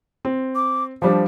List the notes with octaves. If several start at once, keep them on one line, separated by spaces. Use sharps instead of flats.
C4
D6
F3 G3 D4 C5